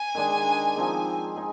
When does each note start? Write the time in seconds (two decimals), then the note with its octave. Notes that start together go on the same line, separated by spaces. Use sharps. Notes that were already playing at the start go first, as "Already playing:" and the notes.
Already playing: G#5
0.15 D#3 G#3 D4 G#4
0.76 F3 C4 D#4 G#4
1.36 D#4 G#4